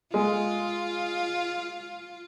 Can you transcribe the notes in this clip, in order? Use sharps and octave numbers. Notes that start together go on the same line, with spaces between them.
G#3 F4